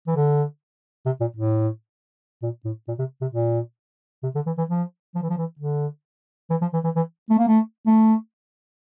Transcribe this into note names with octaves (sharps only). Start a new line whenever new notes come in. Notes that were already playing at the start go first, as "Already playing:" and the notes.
E3
D3
C3
A#2
A2
A#2
A2
A#2
C3
C3
A#2
C3
D3
E3
E3
F3
F3
E3
F3
E3
D3
E3
F3
E3
E3
E3
A3
A#3
A3
A3